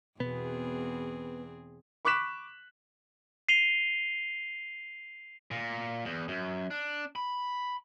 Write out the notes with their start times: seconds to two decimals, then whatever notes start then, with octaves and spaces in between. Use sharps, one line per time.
0.20 E2 B2 B3 C4 G#4
2.05 B5 C#6 D6 F#6 B6 E7
3.49 C7 D#7 F7 G7
5.51 A#2
6.05 E2
6.28 F#2
6.71 D4
7.16 B5